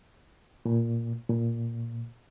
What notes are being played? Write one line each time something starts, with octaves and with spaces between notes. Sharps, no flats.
A#2
A#2